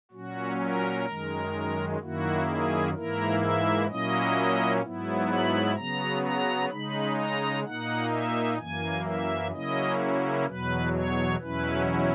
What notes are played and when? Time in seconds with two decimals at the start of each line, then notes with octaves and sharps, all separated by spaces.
0.11 A#2 F#3 C#4 F#4
0.58 A#4
1.05 F#2 D#3 G#3
2.00 F#2 D#3 A#3 E4 F#4
2.46 G#4
2.94 G#2 E3 A#3 E4 A#4
3.40 E5
3.88 A#2 F#3 A#3 C#4 E4 D#5
4.81 G#2 F#3 B3 E4
5.29 B5
5.76 C#3 F#3 B3 A#5
6.23 A#5
6.70 C#3 G#3 D#4 B5
7.17 A#5
7.64 A#2 A#3 D#4 F#5
8.11 E5
8.58 F#2 E3 A#3 G#5
9.05 E5
9.52 C#3 F#3 A#3 C#4 E4 D#5
10.46 E2 B2 F#3 B4
10.93 C#5
11.40 E2 B2 F#3 C#4 E4 B4